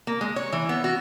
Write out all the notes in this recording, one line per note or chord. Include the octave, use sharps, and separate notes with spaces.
A#3
G#3
C#5
E3
B3
F#4